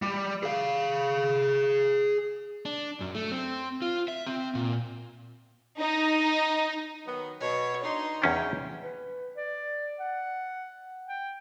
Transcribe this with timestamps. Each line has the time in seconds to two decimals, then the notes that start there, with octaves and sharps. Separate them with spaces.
0.02 G3
0.43 G#4 F5
2.65 D4
3.01 F#2
3.15 A3
3.32 C4
3.82 F4
4.08 E5
4.26 C4
4.55 A#2
5.80 D#4
7.06 D#3 F#3 B3
7.40 B2 C#5
7.83 D4 D#4 C6
8.22 E2 C#3 C#4 D4 G5
8.84 B4
9.37 D5
10.00 F#5
11.07 G5